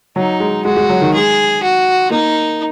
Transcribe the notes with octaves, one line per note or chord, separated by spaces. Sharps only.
F#3 D#4
G#3
G#3 F#4
G#3
F#3
D#3
G#3 G#4
F#4
A#3 D#4